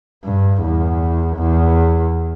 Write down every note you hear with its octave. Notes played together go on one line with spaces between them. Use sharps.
G2
E2
E2